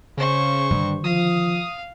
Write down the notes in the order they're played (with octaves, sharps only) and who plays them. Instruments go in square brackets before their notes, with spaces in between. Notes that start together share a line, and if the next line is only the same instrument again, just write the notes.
[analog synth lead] C#3 [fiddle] C5 C#6
[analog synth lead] G2 [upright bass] D3 D#3
[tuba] F3 [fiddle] F5 [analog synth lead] D#6